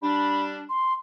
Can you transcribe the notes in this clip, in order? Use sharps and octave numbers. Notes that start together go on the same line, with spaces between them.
G3 D4 B5
C6